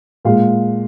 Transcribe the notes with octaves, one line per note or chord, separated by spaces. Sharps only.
A#2 G#3 F5